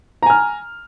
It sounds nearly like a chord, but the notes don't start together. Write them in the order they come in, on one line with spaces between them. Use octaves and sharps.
A#5 G#5 F6